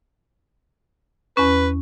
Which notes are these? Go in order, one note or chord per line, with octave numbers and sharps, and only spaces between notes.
E2 C#4 B4